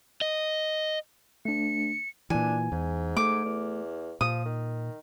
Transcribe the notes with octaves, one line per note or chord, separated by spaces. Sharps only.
D#5
A3 D4 C#7
A#2 E3 D4 G#5
E2 G#2
A3 D6
E2
A#2 F3 D#6
D#3